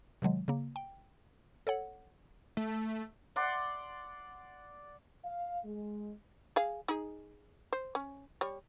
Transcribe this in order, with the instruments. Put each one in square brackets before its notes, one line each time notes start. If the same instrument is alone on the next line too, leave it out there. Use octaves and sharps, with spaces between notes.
[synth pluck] C3 D#3 F#3 G#3
C#3 A#3
G5
A4 C#5 F#5
[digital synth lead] A3
[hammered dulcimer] D5 F#5 C6
[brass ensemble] F5
G#3
[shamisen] G#4 F5
D#4 G#4
C5
C#4
G3 C#5